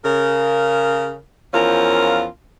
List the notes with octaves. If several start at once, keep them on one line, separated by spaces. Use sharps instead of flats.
C#3 A#4
E2 F3 C#4 F4 A#4